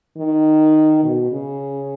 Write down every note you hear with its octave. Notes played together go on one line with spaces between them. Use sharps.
D#3
B2
C#3